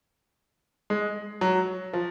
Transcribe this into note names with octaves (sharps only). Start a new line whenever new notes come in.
G#3
F#3
F3